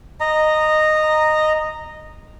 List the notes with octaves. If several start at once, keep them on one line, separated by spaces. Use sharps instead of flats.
D#5 A#5